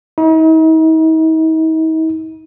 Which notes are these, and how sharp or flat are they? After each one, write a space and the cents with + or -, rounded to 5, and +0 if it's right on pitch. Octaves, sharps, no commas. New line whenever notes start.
D#4 +45